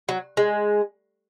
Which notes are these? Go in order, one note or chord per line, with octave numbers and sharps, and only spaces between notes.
F#3
G#3